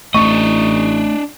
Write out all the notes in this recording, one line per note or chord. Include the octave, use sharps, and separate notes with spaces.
A1 A3 D4 D#5 C#6